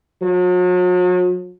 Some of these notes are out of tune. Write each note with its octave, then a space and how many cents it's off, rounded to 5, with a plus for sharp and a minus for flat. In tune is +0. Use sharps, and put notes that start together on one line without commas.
F#3 -40